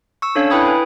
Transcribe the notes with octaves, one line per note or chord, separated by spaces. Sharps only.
C#6 E6
C#4 D4 A4 C#5 F5
E4 B4 G5 B5 D#6 G#6
B4 G#5